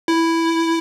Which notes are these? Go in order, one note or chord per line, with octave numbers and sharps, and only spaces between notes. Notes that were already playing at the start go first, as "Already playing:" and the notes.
E4